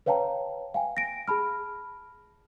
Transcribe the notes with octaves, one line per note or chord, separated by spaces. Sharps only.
B4 C#5 F5 G5 A5 A#5
F5 G5 G#5
A#6 D7
G#4 A5 B5 F6